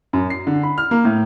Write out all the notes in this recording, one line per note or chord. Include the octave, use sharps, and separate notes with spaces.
F#2
C7
D3
B5
F6
A#3
A2